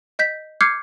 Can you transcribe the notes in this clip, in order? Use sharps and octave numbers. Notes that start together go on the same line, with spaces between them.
D#5 G6 B6
D6 F6 G6 G#6 C7 C#7